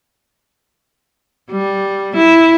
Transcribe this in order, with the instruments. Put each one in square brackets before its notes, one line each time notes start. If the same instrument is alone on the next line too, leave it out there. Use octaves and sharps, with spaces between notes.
[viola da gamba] G3
E4